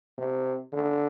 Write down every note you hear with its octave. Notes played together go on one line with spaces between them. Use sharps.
C3
D3